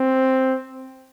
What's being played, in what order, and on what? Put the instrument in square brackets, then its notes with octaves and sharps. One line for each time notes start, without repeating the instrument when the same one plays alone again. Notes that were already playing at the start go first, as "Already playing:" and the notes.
Already playing: [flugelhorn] C4